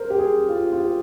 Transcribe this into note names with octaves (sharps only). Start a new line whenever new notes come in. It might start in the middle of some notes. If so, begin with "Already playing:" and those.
Already playing: A#4 C5
G4
G#4
F4
F4
G4